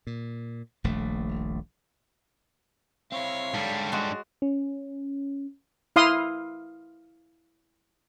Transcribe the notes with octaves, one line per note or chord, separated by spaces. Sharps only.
A#2
D#1 A#1 A3
C4 E4 C#5 F5
G#2 G3 D4 A4
G#3 F#4
C#4
E4 F5 C6 D#6